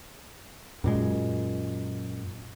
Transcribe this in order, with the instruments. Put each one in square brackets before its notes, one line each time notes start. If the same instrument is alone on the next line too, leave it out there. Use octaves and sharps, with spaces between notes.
[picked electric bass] F#2 A#2 G#3